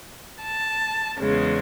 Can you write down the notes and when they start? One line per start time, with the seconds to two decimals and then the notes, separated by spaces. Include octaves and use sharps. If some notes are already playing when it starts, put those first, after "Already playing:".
0.41 A5
1.19 E2 C#3 G#3